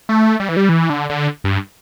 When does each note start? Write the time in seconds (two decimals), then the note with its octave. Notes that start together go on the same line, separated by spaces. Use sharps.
0.09 A3
0.40 G3
0.49 E3
0.57 G3
0.69 E3
0.90 D3
1.10 D3
1.44 G2